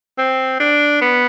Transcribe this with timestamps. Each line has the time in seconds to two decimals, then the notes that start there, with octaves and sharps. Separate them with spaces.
0.18 C4
0.59 D4
1.01 B3